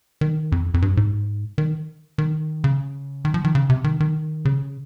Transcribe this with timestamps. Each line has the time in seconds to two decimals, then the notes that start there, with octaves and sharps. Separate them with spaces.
0.21 D#3
0.52 F2
0.74 F2
0.82 G2
0.97 G#2
1.58 D#3
2.18 D#3
2.64 C#3
3.25 D#3
3.34 F3
3.44 D#3
3.55 C#3
3.70 C3
3.84 D#3
4.00 D#3
4.45 C#3